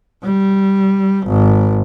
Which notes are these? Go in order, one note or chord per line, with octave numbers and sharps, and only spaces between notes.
G3
G#1